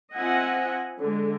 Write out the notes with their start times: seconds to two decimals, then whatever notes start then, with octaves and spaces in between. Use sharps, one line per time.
0.16 C4 F4 D#5 E5 F#5 G#5
1.00 D3 G#3